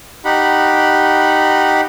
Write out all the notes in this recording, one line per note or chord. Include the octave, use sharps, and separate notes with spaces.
D#4 G4 F#5 B5